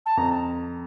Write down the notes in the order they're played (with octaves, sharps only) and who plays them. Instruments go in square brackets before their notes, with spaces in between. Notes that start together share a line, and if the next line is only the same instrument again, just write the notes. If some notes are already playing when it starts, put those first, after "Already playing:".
[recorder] A5
[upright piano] F2 [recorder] A#5